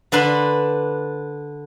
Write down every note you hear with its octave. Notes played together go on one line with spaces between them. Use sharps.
D3 D4 B4 C6